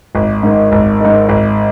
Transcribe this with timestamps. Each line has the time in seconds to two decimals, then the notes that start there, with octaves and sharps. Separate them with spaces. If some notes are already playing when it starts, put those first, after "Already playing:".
0.15 G#1
0.43 G#2 D#3
0.72 G#1
1.01 G#2 D#3
1.29 G#1